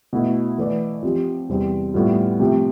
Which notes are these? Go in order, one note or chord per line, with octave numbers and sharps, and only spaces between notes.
B2 A3 E4
E3 A3 E4 B4 D5
F3 C4 G4
E2 C3 G3 C4
A2 G3 B3 F4
C3 F3 A3 C4 G4